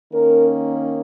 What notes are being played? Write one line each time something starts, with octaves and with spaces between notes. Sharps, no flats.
D#3 A#3 C#4 A#4